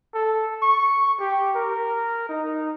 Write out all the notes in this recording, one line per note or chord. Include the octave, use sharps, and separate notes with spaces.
A4
C#6
G4
A#4
D#4